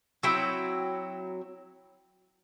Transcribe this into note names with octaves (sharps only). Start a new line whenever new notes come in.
F#3 C4 E4 G5